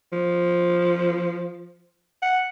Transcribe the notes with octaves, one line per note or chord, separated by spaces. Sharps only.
F3
F#5